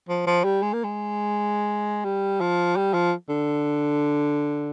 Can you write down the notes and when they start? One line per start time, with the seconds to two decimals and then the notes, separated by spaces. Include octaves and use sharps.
0.09 F3
0.27 F3
0.44 G3
0.62 G#3
0.73 A#3
0.84 G#3
2.04 G3
2.41 F3
2.76 G3
2.94 F3
3.29 D3